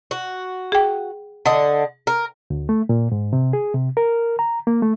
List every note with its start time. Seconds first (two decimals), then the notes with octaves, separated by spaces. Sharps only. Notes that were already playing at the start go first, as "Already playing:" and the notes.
0.11 F#4
0.72 G#4 G5
1.46 D3 D#5
2.07 A#4
2.50 D2
2.69 A3
2.89 A#2
3.12 G#2
3.33 C3
3.53 G#4
3.74 C3
3.97 A#4
4.39 A#5
4.67 A#3
4.82 A3